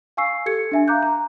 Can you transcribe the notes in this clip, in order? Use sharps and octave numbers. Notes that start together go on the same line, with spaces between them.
F5 G#5 C#6 E6 C7
G4 A4 G#6 C#7
D4 E5 G#5
F5 A#5 D6 F#6 G6
A#5